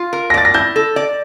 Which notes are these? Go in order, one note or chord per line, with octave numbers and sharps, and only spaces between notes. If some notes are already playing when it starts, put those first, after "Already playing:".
Already playing: F4
A#4
A#6
D5 A6
A#6
E4 G6
A4
D5